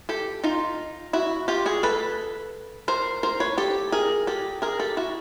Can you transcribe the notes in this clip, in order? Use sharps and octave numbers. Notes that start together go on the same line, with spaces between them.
G4 A4
D#4 F4
E4 F#4
F4 G4
F#4 G#4
A4 B4
A#4 C5
A#4 C5
B4 C#5
G4 A4
G#4 A#4
G4 A4
G#4 A#4
G4 A4
E4 F#4